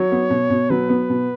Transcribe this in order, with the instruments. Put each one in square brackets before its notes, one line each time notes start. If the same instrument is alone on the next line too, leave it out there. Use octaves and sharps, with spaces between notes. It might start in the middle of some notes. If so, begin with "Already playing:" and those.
Already playing: [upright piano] F#3 [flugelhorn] C#5
[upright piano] B3
B2
B2
[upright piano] F#3 [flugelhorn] B4
[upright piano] B3
B2